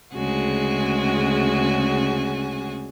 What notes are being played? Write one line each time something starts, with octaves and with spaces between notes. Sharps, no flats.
D2 C#3 G#3 F#4 G#5